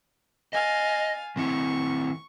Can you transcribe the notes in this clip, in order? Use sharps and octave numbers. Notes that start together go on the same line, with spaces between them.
D#5 F5 G#5 A6
D#3 C4 E4 C#6